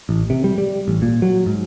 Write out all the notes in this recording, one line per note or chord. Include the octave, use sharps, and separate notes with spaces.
A1
C3
G3
G3
A1
A#2
F#3
G#2